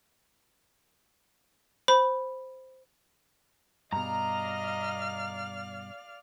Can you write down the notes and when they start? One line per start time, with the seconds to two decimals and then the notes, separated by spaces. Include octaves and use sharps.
1.88 C5 B5
3.92 G2 B2 D5 D#5 F5 A#5 F6